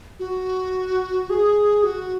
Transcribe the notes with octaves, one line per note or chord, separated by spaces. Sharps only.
F#4
G#4
F#4